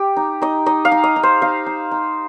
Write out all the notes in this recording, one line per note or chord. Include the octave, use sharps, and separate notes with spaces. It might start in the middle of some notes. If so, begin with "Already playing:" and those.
Already playing: G4
D#4
D#4 D#5
D#4 D#5
F5
D#4
D#5
D#4
C5
D#4 F5
D#4
D#4